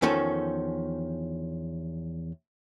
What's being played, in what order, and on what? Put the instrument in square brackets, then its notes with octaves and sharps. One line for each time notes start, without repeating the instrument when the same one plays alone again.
[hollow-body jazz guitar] E2 D#3 F3 C#4 A4